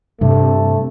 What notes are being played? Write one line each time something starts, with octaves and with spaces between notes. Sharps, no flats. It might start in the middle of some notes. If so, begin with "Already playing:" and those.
G2 C3 A3